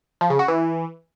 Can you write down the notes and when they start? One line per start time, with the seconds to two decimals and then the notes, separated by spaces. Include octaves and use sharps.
0.21 F3
0.30 C#3
0.39 F#4
0.48 E3